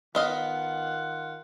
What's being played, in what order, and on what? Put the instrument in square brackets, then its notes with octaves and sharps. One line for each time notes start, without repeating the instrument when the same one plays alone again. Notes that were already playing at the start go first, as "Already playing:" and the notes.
[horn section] D#3 F4 F#5 [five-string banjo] B3 D#5 F5